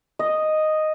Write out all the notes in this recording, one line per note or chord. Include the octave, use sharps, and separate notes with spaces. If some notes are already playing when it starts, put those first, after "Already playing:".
D#5